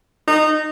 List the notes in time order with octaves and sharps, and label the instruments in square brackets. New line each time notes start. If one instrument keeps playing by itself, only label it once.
[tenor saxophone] D#4